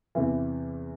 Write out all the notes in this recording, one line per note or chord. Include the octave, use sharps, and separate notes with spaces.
E2 C3 E3